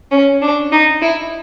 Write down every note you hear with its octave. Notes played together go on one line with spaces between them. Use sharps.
C#4
D4
D#4
E4